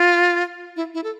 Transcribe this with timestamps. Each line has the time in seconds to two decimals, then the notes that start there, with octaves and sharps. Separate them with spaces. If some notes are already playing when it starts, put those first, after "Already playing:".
Already playing: F4
0.76 E4
0.94 E4
1.04 A4